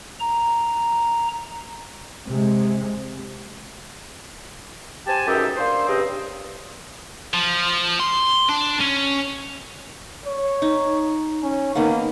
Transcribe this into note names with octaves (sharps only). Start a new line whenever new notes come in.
A#5
C3 G#3
C4 G4 G#5 A5
C#2 F#2 D#4 G4 E5
A#3 D4 C5
G2 C#3 C4 D#5
F3
C6
D4
C#4
C#5
D#4
C#4
D#3 A#3 B3